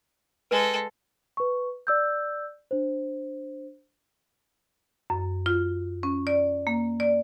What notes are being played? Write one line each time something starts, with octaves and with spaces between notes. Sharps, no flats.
G#3 A4 B4
B4 C#6
D5 E6 G6
D4 C5
F#2
F4
C#4
D5
A#3
D5